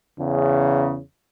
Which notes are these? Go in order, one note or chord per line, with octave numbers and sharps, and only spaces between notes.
E2 C#3